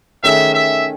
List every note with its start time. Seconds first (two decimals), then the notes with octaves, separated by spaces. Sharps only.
0.23 D#3 A3 C#4 G#4 E5
0.54 E5